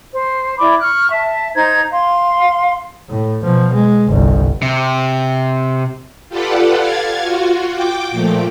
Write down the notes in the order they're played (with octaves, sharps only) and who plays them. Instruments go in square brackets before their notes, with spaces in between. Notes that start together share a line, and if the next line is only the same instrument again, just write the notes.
[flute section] C5
E4 D5 B5 D6
C#6 F6 F#6
E5 A5
D#4 C5 A#5 G#6
F5 C6
[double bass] A2
B2 F3
G#3
G1 C2
[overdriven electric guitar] C3
[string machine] F4 G4 A4 B4 D5 F#5
F5 G#6 A6
F4 F#4
G5 D6
A#2 F3 A3